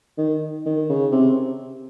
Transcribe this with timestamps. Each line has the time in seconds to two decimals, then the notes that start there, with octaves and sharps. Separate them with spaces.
0.18 D#3
0.66 D#3
0.89 C#3
1.12 C3